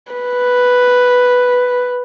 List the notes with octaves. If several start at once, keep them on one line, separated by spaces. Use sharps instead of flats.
B4